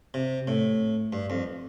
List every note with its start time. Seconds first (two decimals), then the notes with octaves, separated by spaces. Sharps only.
0.14 C3
0.47 A2
1.13 G2
1.30 F2